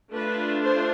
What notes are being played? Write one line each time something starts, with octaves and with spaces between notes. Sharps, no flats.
A3 D4 F4 B4
C5